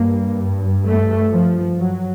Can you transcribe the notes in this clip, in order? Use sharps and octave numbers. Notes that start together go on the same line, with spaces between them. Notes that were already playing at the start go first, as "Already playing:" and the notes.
Already playing: G2 A#3
A3
F3
F#3